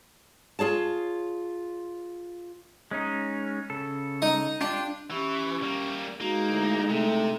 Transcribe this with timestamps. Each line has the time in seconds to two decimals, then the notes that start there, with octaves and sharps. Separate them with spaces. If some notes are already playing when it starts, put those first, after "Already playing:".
0.59 F4 G#4 C#5 A5
2.91 G#3 C#4 D#4
3.70 C#3 A4
4.22 D#4 D#5
4.61 D4 F4 G4
5.11 E3 C#4 G4 C#6
5.63 G3 A#3
6.21 G#3 A#3 D#4 F#4
6.50 D2 D4 E4
6.90 C3 A3